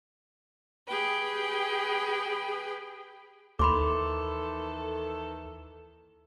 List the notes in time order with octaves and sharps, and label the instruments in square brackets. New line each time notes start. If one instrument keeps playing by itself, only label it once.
[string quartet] G4 G#4 B4 G5
[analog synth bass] D#2 [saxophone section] D#3 E3 A4 [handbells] B5 C6 D6